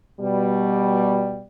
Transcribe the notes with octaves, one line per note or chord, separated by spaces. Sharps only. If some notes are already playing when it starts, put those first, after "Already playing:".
B2 G3